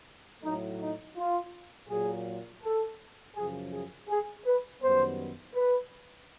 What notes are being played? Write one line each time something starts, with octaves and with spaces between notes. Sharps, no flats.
A2 F#3 A3 D#4
D#4
F4
A#2 F#3 A#3 G#4
A4
F#2 C#3 F3 G#4
G#4
G#4
B4
F#2 D#3 G3 B3 C5
B4